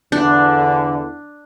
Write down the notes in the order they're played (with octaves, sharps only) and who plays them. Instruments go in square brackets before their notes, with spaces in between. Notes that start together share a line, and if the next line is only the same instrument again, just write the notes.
[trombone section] E2 D3 [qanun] D4